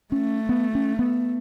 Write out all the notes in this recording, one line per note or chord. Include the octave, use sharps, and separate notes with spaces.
A3 C#4
B3
C#4
B3